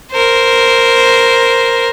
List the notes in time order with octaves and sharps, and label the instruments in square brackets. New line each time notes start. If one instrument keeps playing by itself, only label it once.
[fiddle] A#4 C5